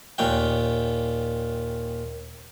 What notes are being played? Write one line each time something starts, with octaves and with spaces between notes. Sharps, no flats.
D#2 A#2 C#4 G5